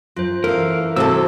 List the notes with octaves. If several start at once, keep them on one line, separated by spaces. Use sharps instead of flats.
F#2 F4 C5
E3 A4 A#4 F5
C3 G3 F#4 A4 E6